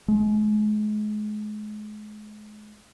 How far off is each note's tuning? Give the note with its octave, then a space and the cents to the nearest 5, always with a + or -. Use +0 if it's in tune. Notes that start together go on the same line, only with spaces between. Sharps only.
G#3 +35